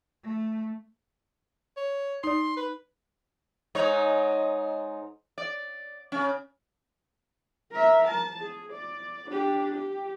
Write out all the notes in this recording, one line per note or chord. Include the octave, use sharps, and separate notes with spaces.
A3
C#5
D#4 D5 C6
B4
G#2 D#4 C#5
D5
C#3 C#4
A#4 E5
A5
G#4
D5
D4 G4
G4